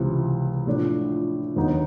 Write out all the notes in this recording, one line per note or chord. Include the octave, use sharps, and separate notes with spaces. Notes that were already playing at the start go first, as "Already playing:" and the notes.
Already playing: C#2 C3 E3
A2 F3 A3 D4
D#2 D3 F#3 B3 D#4